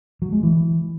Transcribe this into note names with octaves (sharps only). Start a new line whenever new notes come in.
F#3
G#3
E3